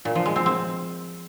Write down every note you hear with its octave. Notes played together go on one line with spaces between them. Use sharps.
A#2
F3
G#3
C4
C4